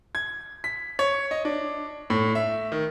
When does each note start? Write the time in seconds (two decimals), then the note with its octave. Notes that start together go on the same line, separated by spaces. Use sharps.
0.15 G#6
0.64 B6
0.99 C#5
1.31 D#5
1.45 D4
2.10 A2
2.35 E5
2.72 D#3